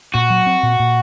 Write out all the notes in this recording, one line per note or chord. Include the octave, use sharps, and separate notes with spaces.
A#2 F#4
F#3
C4
A#2
A#2